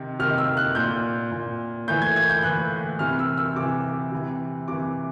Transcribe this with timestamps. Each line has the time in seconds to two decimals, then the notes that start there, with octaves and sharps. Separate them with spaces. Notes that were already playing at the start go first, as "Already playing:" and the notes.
Already playing: C3 D#3
0.19 C3 D#3 F6
0.38 E6
0.57 F#6
0.75 A#2 G6
1.32 A#2
1.88 A2 E3 G6
2.02 G#6
2.16 G#6
2.30 G6
2.43 A2 E3 F#6
2.99 C3 E3 F6
3.19 E6
3.38 E6
3.56 C3 E3 D6
4.12 C3 E3
4.68 C3 E3 D6